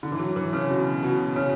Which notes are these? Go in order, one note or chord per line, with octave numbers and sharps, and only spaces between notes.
D3
E3
F#3
E3
C#3
B2
B2
C#3